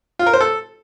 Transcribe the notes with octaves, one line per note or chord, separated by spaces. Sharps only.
F4
A#4
C5
A4